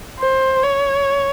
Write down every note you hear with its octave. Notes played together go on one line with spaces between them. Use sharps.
C5
C#5